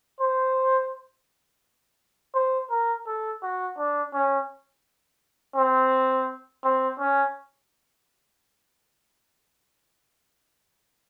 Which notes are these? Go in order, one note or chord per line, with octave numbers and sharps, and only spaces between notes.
C5
C5
A#4
A4
F#4
D4
C#4
C4
C4
C#4